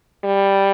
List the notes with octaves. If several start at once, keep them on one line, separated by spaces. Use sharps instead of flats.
G3